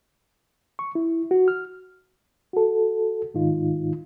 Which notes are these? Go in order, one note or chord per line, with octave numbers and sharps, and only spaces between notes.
C#6
E4
F#4
F6
F#4 A4
G#2 D#3 D#4 F4